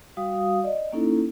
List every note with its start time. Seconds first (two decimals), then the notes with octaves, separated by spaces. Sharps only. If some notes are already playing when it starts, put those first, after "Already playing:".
0.17 G3 F#4 F5 D#6
0.64 D5 D#5
0.92 A#3 C#4 D#4 E4 A4